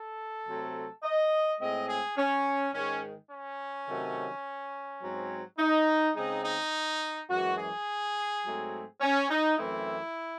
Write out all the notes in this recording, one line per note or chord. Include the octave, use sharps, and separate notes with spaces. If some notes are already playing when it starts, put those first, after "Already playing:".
Already playing: A4
C3 F#3 A3 C4
D#5
A2 G#3 C4 D#5
G#4
C#4
G#2 D#3 G#3 C#4
C#4
C3 D#3 F#3 A3
G#2 F#3 C4
D#4
C#3 G#3 C4 D#4
D#4
F#2 E3 G#3 F#4
G#4
G#2 F#3 A3 C4
C#4
D#4
F#2 E3 A3 C4 E4